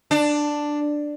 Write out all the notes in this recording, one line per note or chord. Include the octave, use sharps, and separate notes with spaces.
D4